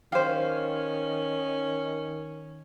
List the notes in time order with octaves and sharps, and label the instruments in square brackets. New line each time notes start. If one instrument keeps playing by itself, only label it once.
[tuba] D#3 [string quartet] C#4 [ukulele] G4 C5 [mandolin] F5